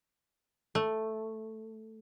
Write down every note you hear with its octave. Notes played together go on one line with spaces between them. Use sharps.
A3